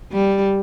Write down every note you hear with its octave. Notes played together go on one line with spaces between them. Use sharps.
G3